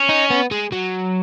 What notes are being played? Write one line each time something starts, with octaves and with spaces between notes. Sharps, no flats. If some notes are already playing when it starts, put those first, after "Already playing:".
Already playing: C#4
D#4
B3
G#3
F#3